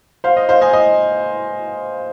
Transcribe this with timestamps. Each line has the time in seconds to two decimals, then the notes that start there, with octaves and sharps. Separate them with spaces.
0.24 C5 F5
0.37 D#5
0.49 C5 F5
0.61 D#5 G#5
0.73 D#5 G#5